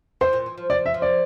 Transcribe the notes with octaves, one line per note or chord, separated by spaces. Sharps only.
E3 C5
A#2
E3
F3
F3 D5
E5
F3
D5